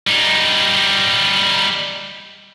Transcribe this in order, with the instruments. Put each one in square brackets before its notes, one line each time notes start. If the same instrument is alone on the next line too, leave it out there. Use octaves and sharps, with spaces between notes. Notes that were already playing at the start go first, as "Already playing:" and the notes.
[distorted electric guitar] G3 D#4